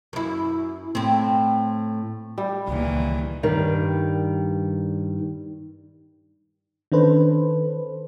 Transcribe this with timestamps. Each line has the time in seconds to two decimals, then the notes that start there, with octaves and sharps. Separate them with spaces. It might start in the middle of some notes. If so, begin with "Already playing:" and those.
0.13 F#2 E4
0.95 A2 C4
2.38 G3
2.67 C#2 A#2 D#3 E3
3.43 G2 D#3 G3
6.92 D#3 C#4 D4 A4 B4 C5